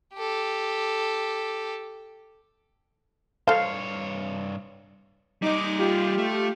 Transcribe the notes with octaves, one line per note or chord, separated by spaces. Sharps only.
G4 A4
G2 A4 C5 C#5 F5
G3 D#4 D#5 D6
F4 G4
A3